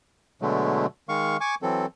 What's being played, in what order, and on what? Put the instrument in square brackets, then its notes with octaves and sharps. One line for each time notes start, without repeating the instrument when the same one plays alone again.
[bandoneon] B2 D3 F#3 G#3 A3
D#3 G#3 F5 C#6
G#5 C#6 D6
E3 F#3 C4 A4